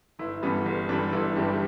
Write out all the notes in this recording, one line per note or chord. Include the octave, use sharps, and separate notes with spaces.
G1 E4
G2 E3 G3 B3
G1
G2 E3 G3 D4
G1 E4
G2 E3 G3 G4
D4